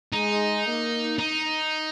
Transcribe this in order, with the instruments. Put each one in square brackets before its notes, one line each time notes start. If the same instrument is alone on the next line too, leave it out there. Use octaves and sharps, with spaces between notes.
[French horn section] G#3 [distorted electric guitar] D#4
[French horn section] A#3
[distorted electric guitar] D#4